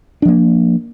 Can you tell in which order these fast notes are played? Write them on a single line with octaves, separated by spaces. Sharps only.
D4 F3 A#3